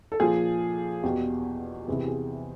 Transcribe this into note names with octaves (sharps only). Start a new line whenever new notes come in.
A4
A#2 F3 G#4
E2 B2 G4
E2 C3 E3 G#4
G4
G#4